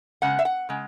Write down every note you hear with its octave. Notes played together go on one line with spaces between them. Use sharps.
C#3 G#3 B3 F#5
E5
F#5
C#3 G#3